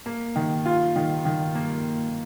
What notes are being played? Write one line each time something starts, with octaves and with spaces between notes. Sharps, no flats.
A#3
D#3
F4
D#3
D#3
A#3